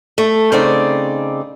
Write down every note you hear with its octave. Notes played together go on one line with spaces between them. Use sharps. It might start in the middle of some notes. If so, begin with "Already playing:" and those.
A3
C#3 C4 D#4 D5